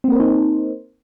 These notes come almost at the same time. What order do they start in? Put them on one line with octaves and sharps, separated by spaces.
C4 A#3 A#4 C5 D#4